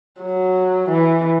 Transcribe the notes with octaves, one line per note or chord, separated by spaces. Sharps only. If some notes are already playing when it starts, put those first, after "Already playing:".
F#3
E3